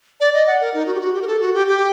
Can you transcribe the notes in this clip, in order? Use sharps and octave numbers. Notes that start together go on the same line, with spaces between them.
D5
D#5
F#5
A#4
D#4
F#4
G4
F#4
G4
A#4
A4
F#4
G4
G4